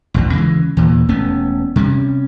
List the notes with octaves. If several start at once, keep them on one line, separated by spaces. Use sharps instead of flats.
A1 E2 B2
C#3 E3 G#3
D#2 A#2 E3
E1 A3 B3 C#4
C3 G3 C#4